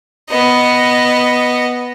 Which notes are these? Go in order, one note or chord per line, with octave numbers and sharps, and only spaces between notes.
B3 D#5